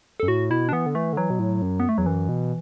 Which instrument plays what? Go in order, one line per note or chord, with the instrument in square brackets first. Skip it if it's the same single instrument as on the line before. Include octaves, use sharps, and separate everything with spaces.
[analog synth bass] F#2 [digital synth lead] A4
[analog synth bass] A2 [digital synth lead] F#4
[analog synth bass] B2 [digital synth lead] E4
[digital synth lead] D4
[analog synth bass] E3 [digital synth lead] B3
[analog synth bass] D3
[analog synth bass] E3 [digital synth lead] A3
[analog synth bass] D3
[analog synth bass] E3 [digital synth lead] F#3
[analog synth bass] B2
A2
F#2
[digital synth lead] B3
A3
[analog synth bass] E2 [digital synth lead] F#3
[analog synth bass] F#2 [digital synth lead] E3
[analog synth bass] B2